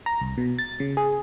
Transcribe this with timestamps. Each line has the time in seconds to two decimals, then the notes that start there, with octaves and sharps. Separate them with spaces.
0.06 A#5
0.21 C2
0.38 B2
0.59 A6
0.80 C#3
0.97 G#4